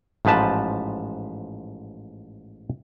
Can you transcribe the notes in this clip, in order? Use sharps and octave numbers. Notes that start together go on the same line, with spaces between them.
A1 G#2 F3 B4 A5